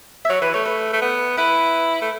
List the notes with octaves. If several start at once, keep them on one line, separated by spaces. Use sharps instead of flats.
E5
F#3 C#5
E3 B4
A3 C#5
B4
A3
B3
E4 B4
A3